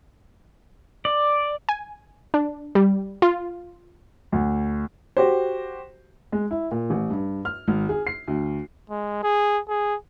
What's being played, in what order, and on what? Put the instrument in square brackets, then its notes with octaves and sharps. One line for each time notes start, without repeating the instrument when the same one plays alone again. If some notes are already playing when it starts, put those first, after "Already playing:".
[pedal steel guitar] D5
[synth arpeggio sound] G#5
D4
G3
F4
[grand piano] D2
[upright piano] F#4 G4 C5
G#3
E4
A#2
A1
G2
F6
G#1
G#4
C7
D2
[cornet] G#3
G#4
G#4